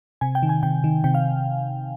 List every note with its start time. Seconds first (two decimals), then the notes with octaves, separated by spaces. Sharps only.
0.21 C3 G#5
0.35 G5
0.43 D#3
0.49 G#5
0.63 C3 G5
0.84 D#3
1.04 C3 G5
1.14 F5